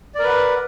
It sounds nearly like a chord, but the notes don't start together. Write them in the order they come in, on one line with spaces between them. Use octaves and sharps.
D5 A#4 B4 F#5